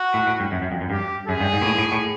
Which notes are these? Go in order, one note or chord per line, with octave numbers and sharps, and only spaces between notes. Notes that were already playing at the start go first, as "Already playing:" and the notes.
Already playing: F#4
A2
A2
G2
F#2
F#2
F2
F#2
G2 G4
F#2 G#4
G2
G#2
A#2
A2
A2
A2